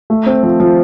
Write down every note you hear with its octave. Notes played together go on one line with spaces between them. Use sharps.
A3
C4
F3
F3